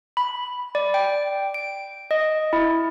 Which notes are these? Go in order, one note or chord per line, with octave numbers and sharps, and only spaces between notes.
B5
D5
G5
D7
D#5
E4